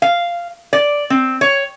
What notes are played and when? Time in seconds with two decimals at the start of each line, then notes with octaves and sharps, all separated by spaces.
0.02 F5
0.73 D5
1.10 C4
1.41 C#5